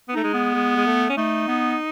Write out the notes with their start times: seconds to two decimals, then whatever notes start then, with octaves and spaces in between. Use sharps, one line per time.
0.09 B3
0.14 A3 D#4
0.24 G#3
0.34 B3
0.54 G#3
0.76 G#3
0.86 A3
1.10 C#4
1.17 A3 D#4
1.48 B3